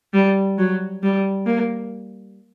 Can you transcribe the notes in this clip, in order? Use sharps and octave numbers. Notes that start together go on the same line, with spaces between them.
G3
F#3
G3
A#3